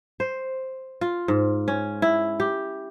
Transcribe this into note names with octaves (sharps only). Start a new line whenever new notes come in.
C5
F4
G#2
C#4
E4
G4